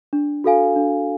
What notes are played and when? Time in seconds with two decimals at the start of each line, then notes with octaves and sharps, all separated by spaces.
0.13 D4
0.44 F#4 A4 F5 G#5
0.76 D4